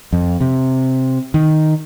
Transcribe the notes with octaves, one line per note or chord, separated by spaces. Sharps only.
F2
C3
D#3